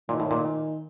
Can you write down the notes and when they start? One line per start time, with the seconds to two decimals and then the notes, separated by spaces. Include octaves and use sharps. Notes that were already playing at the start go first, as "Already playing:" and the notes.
0.09 A#2 D#3
0.20 A2
0.31 A#2